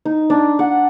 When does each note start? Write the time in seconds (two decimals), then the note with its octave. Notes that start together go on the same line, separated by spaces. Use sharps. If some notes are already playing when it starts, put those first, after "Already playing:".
0.05 D#4
0.30 D4
0.59 F#5